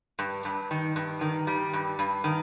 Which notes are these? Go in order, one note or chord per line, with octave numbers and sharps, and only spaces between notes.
G2
G2
D#3
G2
D#3
G3
G2
G2
D#3